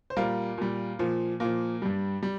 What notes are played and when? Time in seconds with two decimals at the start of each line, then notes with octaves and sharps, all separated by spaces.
0.10 C5
0.17 A#2 G3 F4 A#4
0.57 A#2 G3
0.99 A#2 F3
1.40 A#2 F3 A#3
1.82 G2 G3
2.23 G3